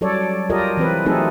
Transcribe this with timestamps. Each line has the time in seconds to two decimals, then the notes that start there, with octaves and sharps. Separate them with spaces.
0.01 F#3 G3 A4 C#5 D5
0.50 F4 G4 A4 A#4 D5 D#5
0.77 E3 C4 B4
1.05 F#3 A3 C4 D#4 G#4 A4